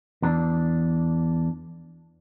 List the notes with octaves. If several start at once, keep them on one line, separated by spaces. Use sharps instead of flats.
E2 D4